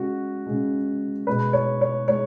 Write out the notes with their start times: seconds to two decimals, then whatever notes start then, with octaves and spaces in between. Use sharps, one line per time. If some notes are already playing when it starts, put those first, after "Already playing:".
Already playing: C#3 G#3 F#4
0.47 C#3 G#3
1.27 B2 G#3 B4
1.53 C#5
1.81 C#5
2.08 G#3 C#5